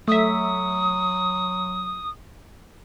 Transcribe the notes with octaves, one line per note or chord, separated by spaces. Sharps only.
F#3 A3 E5 D#6